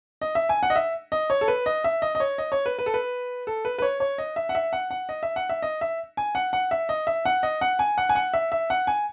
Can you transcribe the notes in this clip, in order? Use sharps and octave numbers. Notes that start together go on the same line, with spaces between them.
D#5
E5
G#5
F#5
D#5
E5
D#5
C#5
A4
B4
D#5
E5
D#5
D#5
C#5
D#5
C#5
B4
B4
A4
B4
A4
B4
B4
C#5
C#5
D#5
E5
F#5
E5
F#5
F#5
D#5
E5
F#5
E5
D#5
E5
G#5
F#5
F#5
E5
D#5
E5
F#5
D#5
F#5
G#5
F#5
G#5
F#5
E5
E5
F#5
G#5